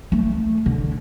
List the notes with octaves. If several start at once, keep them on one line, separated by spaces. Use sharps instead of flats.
A3
D3